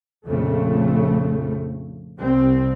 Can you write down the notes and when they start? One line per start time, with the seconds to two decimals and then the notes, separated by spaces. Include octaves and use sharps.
0.28 A#1 F2 C#3 A3
2.18 C2 C4